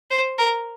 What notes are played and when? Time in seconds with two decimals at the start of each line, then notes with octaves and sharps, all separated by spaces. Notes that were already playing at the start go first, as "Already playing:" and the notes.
0.11 C5
0.38 A#4